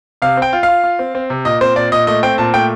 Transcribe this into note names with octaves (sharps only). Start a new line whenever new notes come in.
C3 F5
C4 G5
F4
F5
F4
F4
C4
C4
C3
A#2 D#5
C4 C5
A#2 D5
A#2 D#5
A3 D#5
C4 G5
A#2 A5
A3 G5